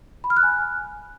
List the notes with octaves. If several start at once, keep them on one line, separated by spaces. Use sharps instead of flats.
B5
F6
F#6
G#5